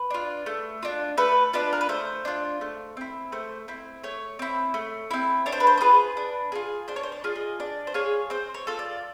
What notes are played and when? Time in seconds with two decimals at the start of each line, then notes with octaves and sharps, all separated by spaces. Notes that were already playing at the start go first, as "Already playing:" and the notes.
Already playing: B4
0.10 D4 F4
0.46 A3
0.83 D4 F4
1.17 A3 B4
1.53 D4 F4 B4
1.73 A#4
1.81 B4
1.89 A3 C5
2.25 D4 F4
2.61 A3
2.97 C4 E4
3.32 A3 C5
3.68 C4 E4
4.03 A3 C#5
4.39 C4 E4
4.74 A3
5.11 C4 E4
5.46 D4 C#5
5.52 C5
5.60 B4
5.67 C5
5.78 C5
5.81 F4 G#4 B4
6.17 D4
6.52 F4 G#4
6.88 D4 C5
6.96 C#5
7.03 C5
7.12 D5
7.24 F4 G#4
7.35 D#5
7.60 D4 D5
7.87 C5
7.94 F4 G#4 C#5
8.30 C4 C5
8.54 C#5
8.67 F4 A4
8.79 D5